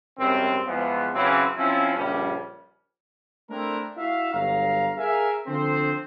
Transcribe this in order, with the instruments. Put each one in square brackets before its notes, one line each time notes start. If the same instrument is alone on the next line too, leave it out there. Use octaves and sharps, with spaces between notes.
[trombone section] G#1 F#2 G3 C4
E2 F3 G#3 B3
C#3 E3 F#3 C4 C#4
F3 C4 C#4 E4
A#1 G2 C#3 G3 C#4
[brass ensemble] A3 C4 D4 E4 A#4
E4 F#4 E5 F5
G1 F#3 F5 A#5
G#4 A#4 E5 F5 G#5
D3 F3 C4 C5